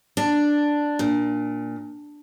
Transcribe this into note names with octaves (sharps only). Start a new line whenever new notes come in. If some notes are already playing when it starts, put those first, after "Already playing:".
D4
A#2